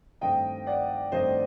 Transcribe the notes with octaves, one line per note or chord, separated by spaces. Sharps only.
G2 D#3 A3 C4 D#5 G5
D5 F#5
G2 D#3 A3 C4 C5 D#5